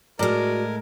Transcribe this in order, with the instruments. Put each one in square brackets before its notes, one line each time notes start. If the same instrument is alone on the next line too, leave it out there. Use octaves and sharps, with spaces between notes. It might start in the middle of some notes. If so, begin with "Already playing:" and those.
[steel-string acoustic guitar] A2 G#3 [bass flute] F#4 [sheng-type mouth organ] A#4 [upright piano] D5 F6